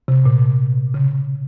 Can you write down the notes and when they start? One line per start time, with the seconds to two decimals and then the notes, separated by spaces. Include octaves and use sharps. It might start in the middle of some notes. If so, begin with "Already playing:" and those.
0.08 C3
0.25 A#2
0.94 C#3